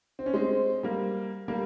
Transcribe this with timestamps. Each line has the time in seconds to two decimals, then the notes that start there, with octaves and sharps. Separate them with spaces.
0.19 C4
0.26 C#4
0.34 G#3 C4
0.83 G3 A#3
1.48 G3 A#3